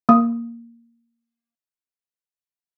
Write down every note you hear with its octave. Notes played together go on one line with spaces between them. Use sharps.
A#3 D#6